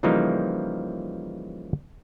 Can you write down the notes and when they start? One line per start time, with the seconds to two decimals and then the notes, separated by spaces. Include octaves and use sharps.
0.03 C#3 E3 F3 G3 A#3 D#4